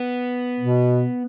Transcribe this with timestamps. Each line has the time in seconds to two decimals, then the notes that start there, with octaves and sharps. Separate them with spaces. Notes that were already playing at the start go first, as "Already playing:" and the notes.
Already playing: B3
0.60 B2